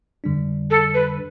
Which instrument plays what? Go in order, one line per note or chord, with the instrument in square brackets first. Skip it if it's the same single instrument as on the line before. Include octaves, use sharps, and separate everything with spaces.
[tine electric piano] F2 D3 G3 D4
[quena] A4
B4